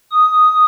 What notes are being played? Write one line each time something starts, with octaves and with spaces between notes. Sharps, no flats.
D#6